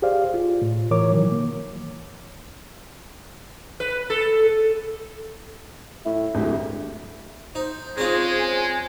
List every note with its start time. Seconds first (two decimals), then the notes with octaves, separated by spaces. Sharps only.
0.02 G4 G#4 C5 D5 F5
0.34 F4
0.62 A2
0.91 A2 E3 A#4 C#5 D6
1.12 B2 D#3 E3 F#3
1.31 A#3
3.80 B4
4.10 A4
6.06 A2 E4
6.35 D1 D2 G#3 G4
7.55 D#4 C5
7.97 G#3 C4 C#4 F4 G#4
8.39 G#5